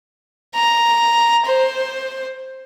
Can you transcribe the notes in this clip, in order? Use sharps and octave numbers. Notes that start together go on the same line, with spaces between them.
A#5
C5